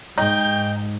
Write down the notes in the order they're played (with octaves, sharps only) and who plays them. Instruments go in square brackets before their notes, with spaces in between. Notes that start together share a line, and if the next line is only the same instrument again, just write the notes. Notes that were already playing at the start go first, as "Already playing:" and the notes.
[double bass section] G#2 [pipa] D#4 [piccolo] G5